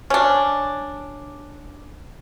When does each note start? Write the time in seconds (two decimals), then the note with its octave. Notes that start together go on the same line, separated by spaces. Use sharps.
0.10 C#4 D4